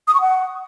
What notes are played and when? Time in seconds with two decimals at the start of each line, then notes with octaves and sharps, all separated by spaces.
0.07 D#6
0.14 C#6
0.21 F#5